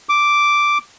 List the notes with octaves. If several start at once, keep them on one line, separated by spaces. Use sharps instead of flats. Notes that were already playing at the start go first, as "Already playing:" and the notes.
D6